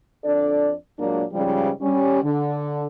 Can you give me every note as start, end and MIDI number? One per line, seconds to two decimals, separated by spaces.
0.24 0.72 41
0.24 0.72 62
0.24 0.72 69
0.24 0.72 74
0.98 1.24 46
0.98 1.24 54
0.98 1.24 56
0.98 1.24 58
0.98 1.24 62
1.32 1.70 44
1.32 1.70 49
1.32 1.70 53
1.32 1.70 55
1.82 2.21 55
1.82 2.21 61
2.23 2.86 50